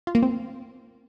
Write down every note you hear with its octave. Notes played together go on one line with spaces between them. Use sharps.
F4
A#3
C4